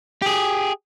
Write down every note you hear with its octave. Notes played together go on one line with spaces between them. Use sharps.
G4 G#4